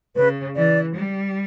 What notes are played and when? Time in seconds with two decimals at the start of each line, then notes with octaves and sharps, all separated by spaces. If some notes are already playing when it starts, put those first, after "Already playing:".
0.16 C#3 B4
0.56 E3 D5
0.95 G3